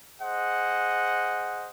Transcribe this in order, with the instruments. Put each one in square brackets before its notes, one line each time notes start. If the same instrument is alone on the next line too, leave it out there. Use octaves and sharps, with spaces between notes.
[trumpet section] G#4 C5 D#5 F#5